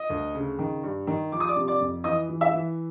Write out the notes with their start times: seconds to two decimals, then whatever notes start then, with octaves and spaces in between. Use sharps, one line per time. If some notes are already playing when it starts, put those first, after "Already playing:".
Already playing: D#5 D#6
0.10 D2
0.35 C#3
0.59 D#3
0.83 G2
1.07 D#3
1.32 F3 D6
1.40 D#6
1.48 D5 D6
1.56 C3
1.68 D5 D6
1.80 F2
2.04 E3 D#5 D#6
2.29 E3
2.41 E5 E6
2.53 E3